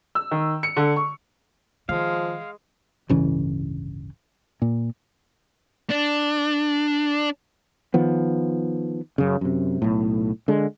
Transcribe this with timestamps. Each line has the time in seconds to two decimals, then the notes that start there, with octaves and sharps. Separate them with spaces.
0.15 E6
0.31 D#3
0.63 C#7
0.77 D3
0.96 C#6
1.89 D#3 F3 G#3 F5
3.09 D1 G1 C#3 E3
4.62 A#2
5.90 D4
7.94 D#3 F3 B3
9.18 F#2 C#3
9.41 F#2 C3
9.82 B1 A2
10.48 D3 G#3